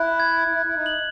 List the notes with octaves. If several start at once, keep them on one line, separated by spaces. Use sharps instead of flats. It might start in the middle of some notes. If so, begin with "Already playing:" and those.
Already playing: E4 F#6
G#6
E4 F#6
E4
D#4
F#7